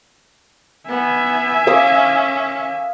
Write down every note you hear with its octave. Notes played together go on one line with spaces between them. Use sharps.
B3 E5 G#5
C#4 F5 D6 D#6